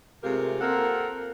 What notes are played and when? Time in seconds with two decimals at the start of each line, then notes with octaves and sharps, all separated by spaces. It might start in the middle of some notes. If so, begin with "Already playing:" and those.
0.23 C3 G#3 A3 F4 G4 A#4
0.61 A#3 C4 F4 A4 A#4 F#5